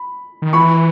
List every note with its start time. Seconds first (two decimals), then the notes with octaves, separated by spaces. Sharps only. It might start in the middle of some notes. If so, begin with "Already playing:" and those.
Already playing: B5
0.42 D#3
0.53 E3 B5 C#6